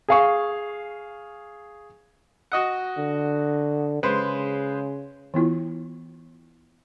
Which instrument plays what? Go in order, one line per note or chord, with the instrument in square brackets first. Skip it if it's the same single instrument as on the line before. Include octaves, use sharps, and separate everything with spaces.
[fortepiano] G#4 F5 C#6
F#4 D#5 F#5
[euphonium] D3
[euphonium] C#3 [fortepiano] G#3 B4 C5
[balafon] E3 B3 E4 F4